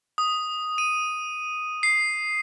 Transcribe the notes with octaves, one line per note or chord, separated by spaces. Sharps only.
D#6
D#7
C7